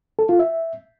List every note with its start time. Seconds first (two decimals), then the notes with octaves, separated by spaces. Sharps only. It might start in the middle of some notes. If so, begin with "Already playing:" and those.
0.19 A4
0.29 F4
0.39 E5